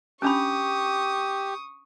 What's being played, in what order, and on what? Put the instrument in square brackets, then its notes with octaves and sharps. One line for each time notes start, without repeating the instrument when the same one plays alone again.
[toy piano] C#4 D4 B5 [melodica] G4 [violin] C#6 D#6